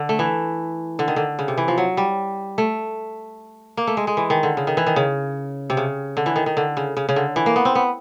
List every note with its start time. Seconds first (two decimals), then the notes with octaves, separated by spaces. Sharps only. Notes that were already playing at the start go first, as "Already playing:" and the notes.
Already playing: D3
0.09 A3
0.19 E3
0.99 D3
1.08 D#3
1.16 D3
1.39 C#3
1.48 C3
1.58 E3
1.68 F3
1.78 F#3
1.97 G3
2.58 A3
3.77 A#3
3.87 A3
3.97 G#3
4.07 G#3
4.17 E3
4.30 D#3
4.43 D3
4.57 C#3
4.67 D#3
4.77 E3
4.87 D#3
4.96 C#3
5.70 C3
5.77 C#3
6.17 D3
6.26 E3
6.36 D#3
6.46 D#3
6.57 D3
6.77 C#3
6.97 C#3
7.09 C#3
7.16 D3
7.36 E3
7.46 A#3
7.56 B3
7.65 C4
7.75 B3